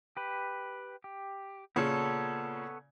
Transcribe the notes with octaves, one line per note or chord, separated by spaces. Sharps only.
G4 B4
G4
A#2 C#3 B3 A4 C#5